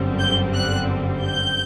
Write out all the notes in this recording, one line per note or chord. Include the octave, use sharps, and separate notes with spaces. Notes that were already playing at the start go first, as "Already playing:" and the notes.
Already playing: G1 F#2 D3 G3 C4
G6
F#6
G6